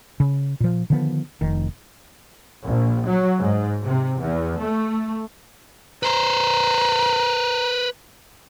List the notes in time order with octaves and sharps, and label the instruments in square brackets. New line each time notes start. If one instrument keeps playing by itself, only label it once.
[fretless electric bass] C#3
A#2 F3
D3 D#3 F3 B3
F1 D#3
[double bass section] A#1
F#3
G#2
C3
E2
A3
[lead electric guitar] B4 C5 [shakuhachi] A#5